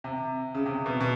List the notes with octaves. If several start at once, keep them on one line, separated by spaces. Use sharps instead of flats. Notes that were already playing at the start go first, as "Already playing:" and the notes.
C3
C#3
C3
B2
B2